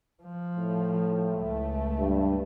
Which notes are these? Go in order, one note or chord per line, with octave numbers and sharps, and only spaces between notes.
F3
A2
C#2 A3
G2